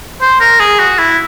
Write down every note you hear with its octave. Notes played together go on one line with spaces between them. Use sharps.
C5
A#4
G#4
F#4
E4